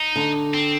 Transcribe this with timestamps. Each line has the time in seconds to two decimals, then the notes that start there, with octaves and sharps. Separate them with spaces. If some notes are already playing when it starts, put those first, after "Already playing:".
Already playing: D#4
0.16 D3
0.54 C4